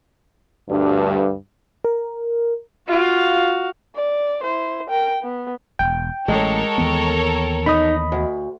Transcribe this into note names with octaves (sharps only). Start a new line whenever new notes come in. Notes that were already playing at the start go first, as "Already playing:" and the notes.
D2 G2
A#4
F4 F#4 F5
D5
E4 C5
A#4 G5
B3
E1 G5
A1 G#3 A4 A#4 C#5
D#2 E3 B3
D#4 D#5 B5
D2